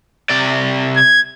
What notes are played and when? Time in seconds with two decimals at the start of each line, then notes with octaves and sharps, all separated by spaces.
0.30 C3 D5
0.96 G#6